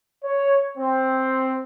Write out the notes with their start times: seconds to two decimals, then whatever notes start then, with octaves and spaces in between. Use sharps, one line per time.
0.24 C#5
0.77 C4